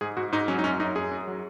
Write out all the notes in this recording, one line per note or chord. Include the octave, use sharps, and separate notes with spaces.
G#2 G#4
G#2 F#4
G#2 D#4
F#3 C#4
D#4
F#2 C#4
F#2 D#4
F#2 G#4
F#2
F#3